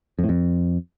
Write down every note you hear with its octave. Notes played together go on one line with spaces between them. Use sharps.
F2
A2
F2